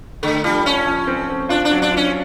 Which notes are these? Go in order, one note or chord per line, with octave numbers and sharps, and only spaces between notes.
D3 A3
F3 G3
F3 C#4
F3
C4
C4
D4 F4
D4
F#3
D4
F4
C#4